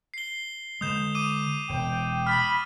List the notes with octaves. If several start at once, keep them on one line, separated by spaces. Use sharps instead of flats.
C7 G7
D3 G#3 D#6 G6 E7
D6 D#6 D#7
E1 G5
B5 F6 A6